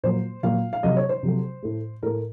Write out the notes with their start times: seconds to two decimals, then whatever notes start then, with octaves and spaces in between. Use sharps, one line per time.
0.03 A#2 F#3 A#3 C5
0.43 A#2 F#3 A#3 F5
0.73 F5
0.83 C3 F#3 A3 D#5
0.96 C#5
1.09 C5
1.23 C3 F#3 A3
1.63 A2 A3
2.03 A2 A3 A#4